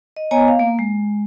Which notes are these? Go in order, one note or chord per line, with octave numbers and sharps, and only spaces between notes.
D#5
B3 C#5 D#5 G#5 A#5
F5
A#3
G#3